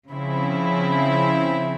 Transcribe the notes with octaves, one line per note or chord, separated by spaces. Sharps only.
C#3 F3 C4 E4